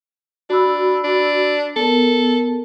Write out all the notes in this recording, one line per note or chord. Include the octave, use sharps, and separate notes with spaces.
D4 F#4 B5 E6
D4
B3 A4 A#4